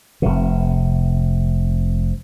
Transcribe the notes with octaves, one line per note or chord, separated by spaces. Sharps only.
F1 C3